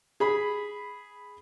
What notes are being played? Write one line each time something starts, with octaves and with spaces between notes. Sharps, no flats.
G#4 B5